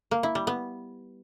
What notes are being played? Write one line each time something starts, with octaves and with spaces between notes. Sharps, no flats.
A#3
E4
G3
B3